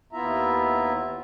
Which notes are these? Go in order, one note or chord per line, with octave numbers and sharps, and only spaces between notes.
D#2 B3 E4 F4 E5 A#5